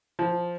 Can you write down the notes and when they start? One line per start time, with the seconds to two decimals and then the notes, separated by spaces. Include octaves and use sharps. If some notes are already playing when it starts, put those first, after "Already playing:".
0.19 F3